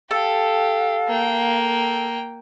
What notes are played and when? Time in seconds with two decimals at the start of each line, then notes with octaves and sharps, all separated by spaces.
0.11 G4 A4 F5
1.08 A#3 G5